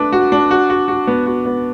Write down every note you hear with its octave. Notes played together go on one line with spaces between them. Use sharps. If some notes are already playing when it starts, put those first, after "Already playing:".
Already playing: A3 D4 B4
F#4
D4
F#4
F#4
F#4
B3
F#4
B3